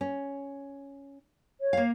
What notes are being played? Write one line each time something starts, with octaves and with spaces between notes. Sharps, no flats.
C#4
C#5
A#3 F5